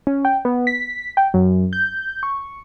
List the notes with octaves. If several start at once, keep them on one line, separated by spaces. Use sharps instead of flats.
C#4
G5
B3
B6
G5
F#2
G6
C#6